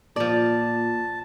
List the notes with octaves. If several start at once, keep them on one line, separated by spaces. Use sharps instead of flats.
A#2 F3 D5 A5